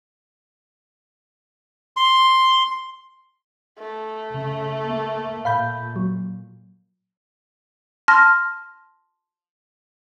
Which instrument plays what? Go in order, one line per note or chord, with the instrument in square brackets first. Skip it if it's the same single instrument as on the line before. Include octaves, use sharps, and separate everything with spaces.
[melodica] C6
[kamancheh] A3
[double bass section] C#3
A#3
[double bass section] A#2 [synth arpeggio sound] F5 B5 G6
[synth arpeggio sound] F#3
[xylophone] A5 C6 F6 A#6